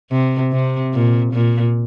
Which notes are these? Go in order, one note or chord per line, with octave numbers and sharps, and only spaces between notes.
C3
C3
A#2
A#2